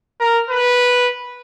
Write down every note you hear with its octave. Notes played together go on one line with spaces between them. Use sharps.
A#4
B4